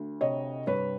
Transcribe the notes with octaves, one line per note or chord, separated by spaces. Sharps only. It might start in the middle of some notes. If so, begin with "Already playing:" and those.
Already playing: D2
C3 C#5 D#5
G2 B4 C#5